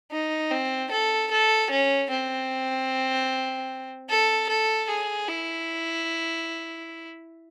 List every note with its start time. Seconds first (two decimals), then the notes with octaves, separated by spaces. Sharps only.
0.12 D#4
0.51 C4
0.91 A4
1.31 A4
1.70 C#4
2.10 C4
4.10 A4
4.49 A4
4.89 G#4
5.28 E4